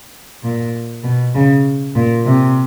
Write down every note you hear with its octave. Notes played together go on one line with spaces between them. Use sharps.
A#2
B2
C#3
A#2
C3